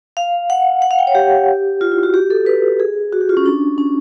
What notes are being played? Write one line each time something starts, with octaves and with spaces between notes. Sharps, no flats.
F5
F#5
F#5
F5
G5
C#5
G4
F4
E4
F#4
G4
A4
B4
G#4
F#4
G4
F4
C#4
D4
C#4